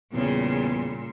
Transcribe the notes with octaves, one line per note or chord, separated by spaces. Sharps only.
E2 A#2 C#3 G3